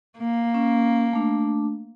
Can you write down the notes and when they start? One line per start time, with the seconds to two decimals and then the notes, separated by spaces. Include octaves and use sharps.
0.18 A#3
0.54 C#4
1.13 A3 D4